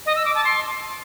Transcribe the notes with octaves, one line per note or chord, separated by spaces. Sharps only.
D#5
E6
D6
A5
C6